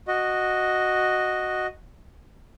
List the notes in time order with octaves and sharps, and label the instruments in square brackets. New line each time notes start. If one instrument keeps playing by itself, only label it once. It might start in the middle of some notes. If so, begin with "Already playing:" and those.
[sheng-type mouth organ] F#4 D#5